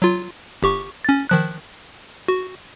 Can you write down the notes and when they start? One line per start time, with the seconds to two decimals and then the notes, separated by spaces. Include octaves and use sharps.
0.02 F#3 F4
0.63 G1 G4 C#6
1.05 C#4 A6
1.29 D#3 F3 F#6
2.28 F#4